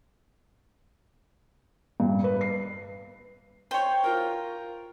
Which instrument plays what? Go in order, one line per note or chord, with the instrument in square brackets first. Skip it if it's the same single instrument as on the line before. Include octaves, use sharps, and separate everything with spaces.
[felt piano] G2
B4
C7
[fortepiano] C5 C#5 [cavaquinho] G5
[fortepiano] F4 A#4